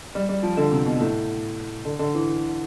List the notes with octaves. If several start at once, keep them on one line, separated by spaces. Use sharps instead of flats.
G3
G3
F3
D3
C3
B2
A2
D3
D3
E3